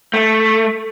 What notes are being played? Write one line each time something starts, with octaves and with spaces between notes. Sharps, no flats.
A3